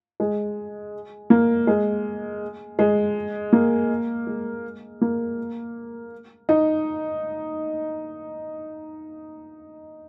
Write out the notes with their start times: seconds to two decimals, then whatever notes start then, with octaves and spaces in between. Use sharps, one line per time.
0.20 G#3
1.30 A#3
1.67 G#3
2.79 G#3
3.53 A#3
4.27 G#3
5.01 A#3
6.49 D#4